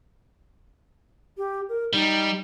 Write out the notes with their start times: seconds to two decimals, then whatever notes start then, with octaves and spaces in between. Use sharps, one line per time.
1.38 G4
1.69 A#4
1.93 G3 D#4